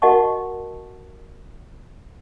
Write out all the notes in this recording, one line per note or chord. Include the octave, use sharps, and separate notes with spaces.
F#4 A#4 D#5 F#5 A5 C#6